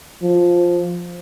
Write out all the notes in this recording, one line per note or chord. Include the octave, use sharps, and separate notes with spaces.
F3